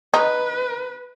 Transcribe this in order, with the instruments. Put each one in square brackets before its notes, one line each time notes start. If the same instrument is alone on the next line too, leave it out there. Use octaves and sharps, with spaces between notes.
[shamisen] D#4 [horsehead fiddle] B4